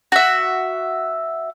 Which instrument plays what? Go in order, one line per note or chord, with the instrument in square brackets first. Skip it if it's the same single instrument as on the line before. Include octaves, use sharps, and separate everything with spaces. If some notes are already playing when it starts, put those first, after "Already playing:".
[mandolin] F#4 E5